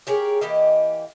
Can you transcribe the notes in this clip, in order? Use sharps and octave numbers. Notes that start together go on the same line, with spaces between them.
G4 G#4 A#4 C#5
E3 A#3 G4 D#5